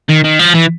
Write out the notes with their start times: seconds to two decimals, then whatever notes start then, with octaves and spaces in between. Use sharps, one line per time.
0.09 D#3
0.24 D#3
0.39 F3
0.55 E3